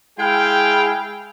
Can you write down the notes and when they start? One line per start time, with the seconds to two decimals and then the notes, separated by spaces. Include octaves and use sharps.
0.19 G#3 E4 G#4 F5 G5